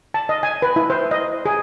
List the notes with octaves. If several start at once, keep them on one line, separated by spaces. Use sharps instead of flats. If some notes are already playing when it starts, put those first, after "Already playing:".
A5
D#5
G#5
B4
E4
C5
D#5
G#4